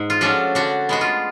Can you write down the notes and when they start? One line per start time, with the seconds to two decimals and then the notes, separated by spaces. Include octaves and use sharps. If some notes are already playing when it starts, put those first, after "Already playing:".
Already playing: G#2
0.10 F4
0.21 F3 A3 C#4 D4 F#4
0.55 D3 D4 F#4
0.89 G#3 B3 F#4
1.01 F4